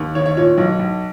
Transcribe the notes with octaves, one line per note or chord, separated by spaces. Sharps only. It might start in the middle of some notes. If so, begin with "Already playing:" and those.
Already playing: D#2
D#3 C#5
C#5
A#2 C#5
B1
B1